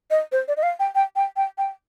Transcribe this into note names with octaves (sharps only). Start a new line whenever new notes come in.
D#5
C5
D5
D#5
F5
G5
G5
G5
G5
G5